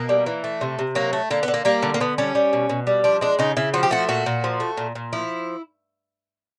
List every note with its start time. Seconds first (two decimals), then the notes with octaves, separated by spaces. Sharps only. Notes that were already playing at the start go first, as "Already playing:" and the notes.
Already playing: B2 A#3
0.09 G3
0.26 E3
0.44 A3
0.61 C3
0.79 C3
0.95 F#3 A#3
1.13 A3
1.31 D3 A#3
1.43 B3
1.48 D3
1.54 A#3
1.65 G3 A#3
1.82 D3
1.94 A#3
2.00 D3 B3
2.18 G3 C#4
2.35 G3
2.53 B2
2.69 B2
2.87 G3
3.04 F3 D4
3.21 G#3 D4
3.39 C#3 D#4
3.57 C#3 E4
3.74 F3 F#4
3.83 G4
3.91 A3 F#4
4.09 A#2 F#4
4.26 A#2
4.44 F3
4.60 A3
4.77 A#2
4.95 A#2
5.13 F3 E4